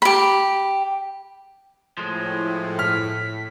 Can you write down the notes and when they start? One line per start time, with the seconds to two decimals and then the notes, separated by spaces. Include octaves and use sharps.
0.02 G4 B5
1.97 A2 F3 G#3
2.79 F6 B6